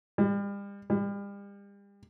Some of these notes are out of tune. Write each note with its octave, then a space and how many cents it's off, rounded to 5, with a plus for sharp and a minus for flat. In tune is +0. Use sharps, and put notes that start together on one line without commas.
G3 +40
G3 +40